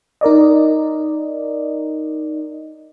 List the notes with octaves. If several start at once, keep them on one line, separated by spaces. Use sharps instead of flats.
D#4 A#4 D5 D#5